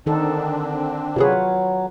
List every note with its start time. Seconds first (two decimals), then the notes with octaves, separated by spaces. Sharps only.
0.06 D3 D#3 C4 D4 D#4 A4
1.16 C3 F#3 F4 G#4 B4 C#5